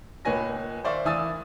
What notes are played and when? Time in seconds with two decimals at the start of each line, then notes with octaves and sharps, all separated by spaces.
0.25 C#2 A#2 B4 C#5 G#5 A#6
0.84 D#3 C5 D5 E5 F5 C#6
1.05 E3 G#5 D#6 E6 A6